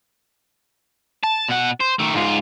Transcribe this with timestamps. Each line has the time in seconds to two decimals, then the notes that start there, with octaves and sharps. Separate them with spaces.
1.24 A5
1.49 B2 F#5
1.81 C5
1.99 D#3 A3
2.14 G#2 F4